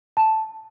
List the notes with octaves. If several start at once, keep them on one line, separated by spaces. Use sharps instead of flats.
A5